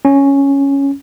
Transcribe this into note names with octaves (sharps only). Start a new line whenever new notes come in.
C#4